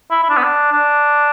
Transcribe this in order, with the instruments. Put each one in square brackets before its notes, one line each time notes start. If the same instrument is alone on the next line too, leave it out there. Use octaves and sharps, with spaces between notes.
[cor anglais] E4
E4
D4
B3
D4
D4